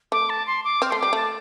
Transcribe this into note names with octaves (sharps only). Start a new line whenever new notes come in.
A3 D6
A5
C6
D6
C4 F6
A3 C6
G3 D6
A3 A5